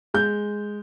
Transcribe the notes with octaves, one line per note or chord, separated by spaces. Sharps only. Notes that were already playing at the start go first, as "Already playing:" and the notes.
G#3 G6